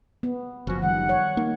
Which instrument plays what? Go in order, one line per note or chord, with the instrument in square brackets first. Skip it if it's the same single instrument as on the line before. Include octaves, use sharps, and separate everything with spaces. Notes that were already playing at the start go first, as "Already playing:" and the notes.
[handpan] B3
[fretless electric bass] F#1 F3 [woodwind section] C#4 F#4
[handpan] D#3 G3 [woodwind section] F#5
[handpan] C#5
[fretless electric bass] A#3 [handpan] D#4